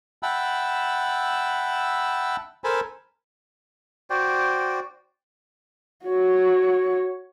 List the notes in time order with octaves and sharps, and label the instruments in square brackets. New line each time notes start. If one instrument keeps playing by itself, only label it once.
[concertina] E5 F#5 G5 A5 B5 E6
A4 A#4 C5 G#5 A5 B5
[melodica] F#4 C5 D5 G5
[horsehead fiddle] F#4 C#5